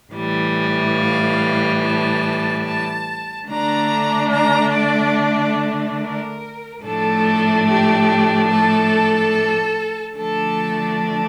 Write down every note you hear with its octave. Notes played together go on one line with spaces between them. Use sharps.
A2 E3 G3
F5
A5
A5
D3 A3 D4 A#5
A#5
D5
A#4
A2 F3 A3 D4 A4
G4
A4
D3 F3 A3 D4 A4